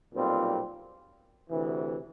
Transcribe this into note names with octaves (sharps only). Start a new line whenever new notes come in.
B1 A#2 G3 C4 F4
D2 C3 E3